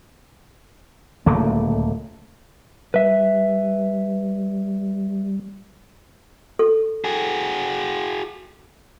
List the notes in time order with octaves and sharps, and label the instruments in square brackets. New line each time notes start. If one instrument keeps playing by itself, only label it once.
[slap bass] D1 C#2 A3 A#3
[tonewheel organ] G3 [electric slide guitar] B4 E5
[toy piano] A4
[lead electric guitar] F#4 G#4